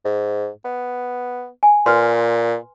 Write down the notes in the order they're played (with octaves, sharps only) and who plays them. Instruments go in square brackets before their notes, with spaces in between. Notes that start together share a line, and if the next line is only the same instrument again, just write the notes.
[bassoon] G#2
B3
[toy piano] G#5
[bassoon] A#2 [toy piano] B4 C6